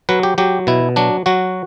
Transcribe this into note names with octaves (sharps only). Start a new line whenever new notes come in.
F#3 B4
G4
F#3 G4
B2 E4
F#3 D4
F#3 F#4